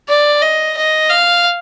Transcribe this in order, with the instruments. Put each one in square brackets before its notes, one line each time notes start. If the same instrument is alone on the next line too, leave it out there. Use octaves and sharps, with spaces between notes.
[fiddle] D5
D#5
D#5
F5